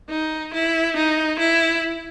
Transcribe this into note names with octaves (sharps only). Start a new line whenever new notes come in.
D#4
E4
D#4
E4